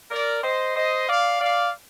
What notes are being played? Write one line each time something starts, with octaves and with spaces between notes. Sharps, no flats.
A#4 D5
C5 D#5
C5 D#5
D5 F5
D5 F5